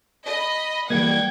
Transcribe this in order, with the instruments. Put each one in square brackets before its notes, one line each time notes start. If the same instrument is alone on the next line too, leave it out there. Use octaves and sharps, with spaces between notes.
[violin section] D#5 B5
[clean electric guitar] E3 G3 A#3 [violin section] F#5 G5 [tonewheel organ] G#6